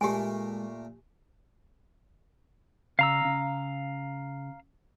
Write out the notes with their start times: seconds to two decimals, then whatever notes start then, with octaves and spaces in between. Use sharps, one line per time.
0.01 A#2 G#3 A3 G4 G#5
2.99 C#3 F5 A#5 E6
3.25 C#3